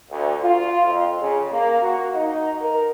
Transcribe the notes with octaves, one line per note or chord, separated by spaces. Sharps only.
D2
F4
F2
C#3
A#3
F#4
D#4
A#4